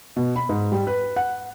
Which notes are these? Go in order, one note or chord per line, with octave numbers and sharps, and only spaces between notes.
B2
B5
G#2
G3
B4
F#5